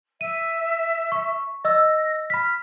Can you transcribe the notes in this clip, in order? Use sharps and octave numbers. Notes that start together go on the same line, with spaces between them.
E5 D#7
C#6
D#5 E6 A#6
B5 F6 B6